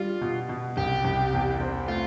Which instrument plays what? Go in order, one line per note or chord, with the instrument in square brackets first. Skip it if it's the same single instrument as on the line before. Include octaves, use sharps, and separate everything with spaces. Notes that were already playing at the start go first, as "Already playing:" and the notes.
Already playing: [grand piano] G3 D4 [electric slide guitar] F4
[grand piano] B2
B2
[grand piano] C2 [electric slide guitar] G4
[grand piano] C2
E2
C4
[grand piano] A3 [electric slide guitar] F4